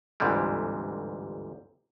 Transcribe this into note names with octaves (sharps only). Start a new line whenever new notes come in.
G1 D2 G#2 C3 E3 G3